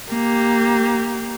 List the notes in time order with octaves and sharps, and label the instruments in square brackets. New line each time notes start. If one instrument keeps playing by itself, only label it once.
[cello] A#3 G4